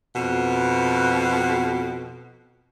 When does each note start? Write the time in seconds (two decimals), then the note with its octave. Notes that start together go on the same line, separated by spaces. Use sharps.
0.16 F2 B2